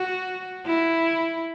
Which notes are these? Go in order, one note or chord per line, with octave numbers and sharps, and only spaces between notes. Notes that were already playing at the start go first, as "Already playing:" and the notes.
Already playing: F#4
E4